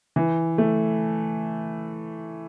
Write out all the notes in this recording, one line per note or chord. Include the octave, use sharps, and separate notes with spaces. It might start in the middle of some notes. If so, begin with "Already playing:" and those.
E3
A3